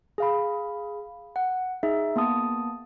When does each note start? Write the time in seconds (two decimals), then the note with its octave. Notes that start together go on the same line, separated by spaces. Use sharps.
0.18 G#4 F5 B5
1.36 F#5
1.83 D#4 G#4 E5
2.16 A#3 B3 A5 D#6